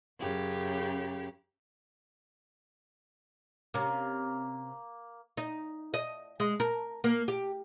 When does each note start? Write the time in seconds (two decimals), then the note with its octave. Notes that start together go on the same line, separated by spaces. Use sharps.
0.19 F#2 C#3 G4
3.74 C3 A#3 C#4
5.37 D#4
5.94 D#5
6.40 G#3
6.60 A#4
7.04 A#3
7.28 G4